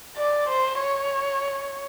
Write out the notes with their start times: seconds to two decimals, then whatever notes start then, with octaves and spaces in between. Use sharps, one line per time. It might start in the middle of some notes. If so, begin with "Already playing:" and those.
0.17 D5
0.49 C5
0.81 C#5